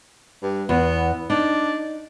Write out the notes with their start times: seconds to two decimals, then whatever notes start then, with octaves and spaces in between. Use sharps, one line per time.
0.42 G2
0.69 E2 B3
1.30 D4 D#4